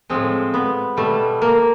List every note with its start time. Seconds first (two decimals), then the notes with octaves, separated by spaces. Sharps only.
0.10 A2 F3 G#3 C4
0.54 B3
0.97 B2 G3 A3
1.42 A#3